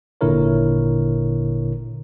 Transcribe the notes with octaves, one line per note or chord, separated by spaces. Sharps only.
G#1 A#2 D3 E4 A#4 C#5